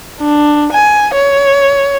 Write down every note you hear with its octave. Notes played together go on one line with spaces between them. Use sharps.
D4
G#5
C#5